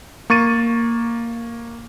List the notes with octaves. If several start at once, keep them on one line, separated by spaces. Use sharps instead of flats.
A#3 C#6 A6 D#7